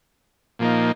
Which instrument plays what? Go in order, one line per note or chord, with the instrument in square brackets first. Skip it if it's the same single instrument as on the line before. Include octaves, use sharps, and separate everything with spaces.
[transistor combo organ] A#2 F3 A#3 D#4